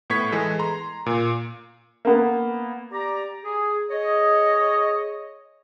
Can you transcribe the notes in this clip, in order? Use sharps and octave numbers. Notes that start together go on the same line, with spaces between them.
A2 B3 C#6 G#6 B6
E3 G#3 A4
A#5 C6
A#2
A#3 B3
G4 D5 A#5
G#4
G#4 C#5 D#5